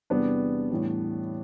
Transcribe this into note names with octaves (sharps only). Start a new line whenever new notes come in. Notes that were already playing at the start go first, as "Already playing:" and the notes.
E2 C3 G3 B3 D4
A2 E3 G3